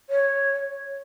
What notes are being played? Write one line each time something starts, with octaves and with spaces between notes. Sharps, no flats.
C#5